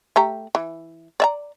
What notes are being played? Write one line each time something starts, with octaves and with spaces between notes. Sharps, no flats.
A3 G4 A#5
E3
D5 E5 A#5